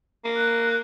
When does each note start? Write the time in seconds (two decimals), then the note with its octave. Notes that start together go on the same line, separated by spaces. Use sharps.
0.25 A#3
0.37 F#6